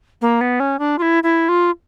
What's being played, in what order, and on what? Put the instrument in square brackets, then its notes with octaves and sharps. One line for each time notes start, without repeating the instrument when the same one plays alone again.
[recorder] A#3
B3
C#4
D4
F4
E4
E4
F4